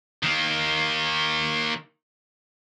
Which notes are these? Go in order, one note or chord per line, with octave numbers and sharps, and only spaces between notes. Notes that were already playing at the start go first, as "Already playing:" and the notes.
D#3 A#3